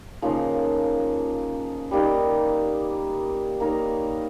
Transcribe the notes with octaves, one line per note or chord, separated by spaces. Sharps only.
C#3 F3 A#3 D#4
G3 A#3 D#4
A#3 D#4 A#4 C#5